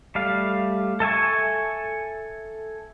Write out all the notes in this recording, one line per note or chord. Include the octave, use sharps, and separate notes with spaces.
G3 A3 F5
A4 E5 G#5 C#6